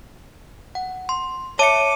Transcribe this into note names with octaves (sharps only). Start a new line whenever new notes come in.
F#5
C6
C#5 E5 A5 D6 C#7 D#7